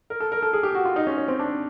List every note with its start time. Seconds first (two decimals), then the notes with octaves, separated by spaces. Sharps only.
0.10 A#4
0.20 A4
0.32 A#4
0.42 A4
0.53 G#4
0.63 G4
0.75 F#4
0.85 F4
0.96 D#4
1.07 C#4
1.18 C#4
1.28 C4
1.39 D4